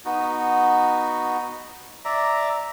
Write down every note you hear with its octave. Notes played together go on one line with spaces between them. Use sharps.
B3 D#4 F#4
D5 E5 A#5